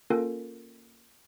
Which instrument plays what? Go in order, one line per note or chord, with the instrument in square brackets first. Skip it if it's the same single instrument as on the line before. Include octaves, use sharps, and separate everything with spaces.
[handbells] A#3 C#4 F4 A4 A#4 G5